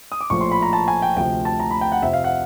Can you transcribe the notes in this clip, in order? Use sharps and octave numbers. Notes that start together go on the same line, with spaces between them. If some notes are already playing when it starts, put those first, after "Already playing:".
D#6
D6
A#1 A2 F3 C#6
C6
B5
A#5
A5
G#5
G5
D2 C3 F3 G5
A5
A#5
B5
G5
F#5
F2 C3 F3 E5
F5
F#5